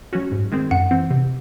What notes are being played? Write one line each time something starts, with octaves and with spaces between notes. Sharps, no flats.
F#3 C#4 F#4
G#2
D#3 G#3 C4
F#2 F#5
E3 C4
C3